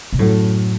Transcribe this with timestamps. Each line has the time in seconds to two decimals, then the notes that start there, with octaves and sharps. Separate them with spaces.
0.13 B2
0.19 F#2 A2 F#3 A3 E4 A4